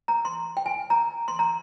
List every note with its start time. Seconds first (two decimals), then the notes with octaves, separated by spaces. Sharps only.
0.08 A#5
0.25 C6
0.57 G5
0.66 G#5
0.90 A#5
1.28 C6
1.39 A#5